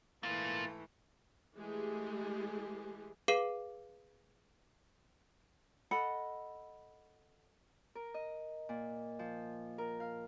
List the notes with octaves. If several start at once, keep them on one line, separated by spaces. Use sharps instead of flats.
G#2 E3 A3 A#3 F4 A6
E3 G#3 A3 G4 G#4
G#4 B4 F5 D6 C7 D#7
A4 D#5 F#5 B5
A#4
D#5
A#2
F3
A#4
F5